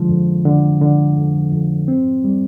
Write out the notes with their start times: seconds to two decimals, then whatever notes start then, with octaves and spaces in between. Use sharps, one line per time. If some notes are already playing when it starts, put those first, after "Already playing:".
Already playing: D3 F3 G#3
0.09 F2
0.45 D3
0.81 D3
1.17 F2
1.52 F2
1.88 C4
2.24 G3